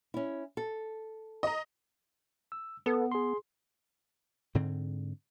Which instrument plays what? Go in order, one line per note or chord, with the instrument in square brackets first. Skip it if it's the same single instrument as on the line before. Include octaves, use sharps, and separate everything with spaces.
[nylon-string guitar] C#4 E4
A4
[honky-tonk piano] D#5 A#5
[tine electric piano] E6
[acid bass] B3 [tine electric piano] A4 B4
[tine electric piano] G#4 C6
[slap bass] G#2 D3 C4